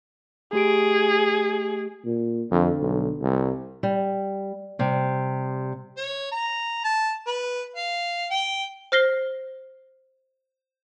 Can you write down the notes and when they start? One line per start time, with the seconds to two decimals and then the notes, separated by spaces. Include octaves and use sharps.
0.53 A3 G4 G#4 D7
2.05 A#2
2.51 F2 D3
2.81 B1
3.22 C2
3.83 G3
4.79 C3 G3
5.97 C#5
6.32 A#5
6.85 A5
7.27 B4
7.76 F5
8.31 G5
8.92 C5 F6 A#6 C7 G7